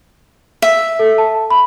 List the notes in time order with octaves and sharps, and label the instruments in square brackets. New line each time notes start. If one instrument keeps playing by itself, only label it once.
[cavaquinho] E5
[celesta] A4
A5
B5